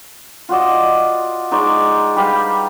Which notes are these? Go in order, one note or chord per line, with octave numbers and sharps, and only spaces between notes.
F4 F#4 D5 D#5
G#3 D#4 D5 C#6
G3 G4 B4 F5